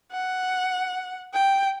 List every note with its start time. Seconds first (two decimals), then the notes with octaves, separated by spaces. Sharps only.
0.12 F#5
1.33 G5